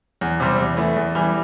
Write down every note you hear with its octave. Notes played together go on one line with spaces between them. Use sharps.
E2
C3 G3 C4
E2
E3 A3
E2
E3 G3